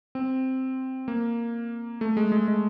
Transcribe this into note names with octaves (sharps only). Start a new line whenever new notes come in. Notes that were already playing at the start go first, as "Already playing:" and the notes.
C4
A#3
A3
G#3
G#3
G#3